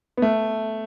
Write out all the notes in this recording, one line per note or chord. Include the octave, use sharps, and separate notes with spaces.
B3
A3